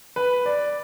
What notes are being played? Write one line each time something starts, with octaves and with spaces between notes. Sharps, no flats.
B4
D5